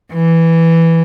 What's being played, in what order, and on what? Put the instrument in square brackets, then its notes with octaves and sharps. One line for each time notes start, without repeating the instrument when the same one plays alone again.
[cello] E3